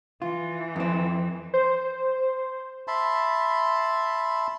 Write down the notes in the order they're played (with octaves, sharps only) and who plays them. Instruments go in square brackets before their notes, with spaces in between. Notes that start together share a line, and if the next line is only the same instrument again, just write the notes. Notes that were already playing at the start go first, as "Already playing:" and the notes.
[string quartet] E3 [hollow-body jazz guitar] F4
[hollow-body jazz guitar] F2 C4
[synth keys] C5
[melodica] E5 A5 B5 C6